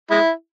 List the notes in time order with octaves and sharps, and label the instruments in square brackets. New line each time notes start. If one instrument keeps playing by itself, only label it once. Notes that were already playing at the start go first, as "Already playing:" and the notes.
[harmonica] G#3 E4